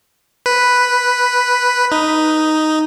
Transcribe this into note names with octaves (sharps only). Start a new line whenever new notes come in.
B4
D#4